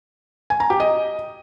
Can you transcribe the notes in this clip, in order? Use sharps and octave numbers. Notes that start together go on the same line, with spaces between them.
G#5
A#5
G4
D#5